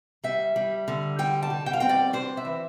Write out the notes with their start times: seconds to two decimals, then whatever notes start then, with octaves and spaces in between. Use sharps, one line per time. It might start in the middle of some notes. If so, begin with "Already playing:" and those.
0.24 G3 E5
0.56 G3
0.88 D3
1.19 G3 G5
1.42 A5
1.50 G3
1.66 G5
1.73 F5
1.80 C4 G5
1.89 D5
2.13 D4 C5
2.37 E5
2.45 E3